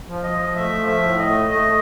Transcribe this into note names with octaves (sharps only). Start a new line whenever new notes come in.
F3
D#5
F3
A3 E5
F3
E5
A2
D#5
A3
A3 D#5